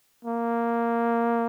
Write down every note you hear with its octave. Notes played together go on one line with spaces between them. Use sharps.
A#3